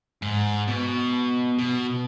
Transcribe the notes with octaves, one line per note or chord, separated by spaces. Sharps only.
G#2
B2
B2